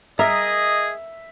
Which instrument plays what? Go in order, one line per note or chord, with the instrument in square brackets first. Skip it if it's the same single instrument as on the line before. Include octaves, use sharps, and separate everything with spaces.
[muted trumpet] G#4 [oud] A#4 [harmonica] D#5 [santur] E5